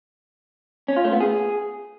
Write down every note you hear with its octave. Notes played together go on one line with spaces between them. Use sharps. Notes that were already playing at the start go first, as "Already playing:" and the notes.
C#4
F4
A3
B3
G#4